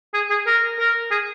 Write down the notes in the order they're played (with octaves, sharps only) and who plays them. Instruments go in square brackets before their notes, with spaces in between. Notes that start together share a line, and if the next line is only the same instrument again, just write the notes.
[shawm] G#4
G#4
A#4
A#4
G#4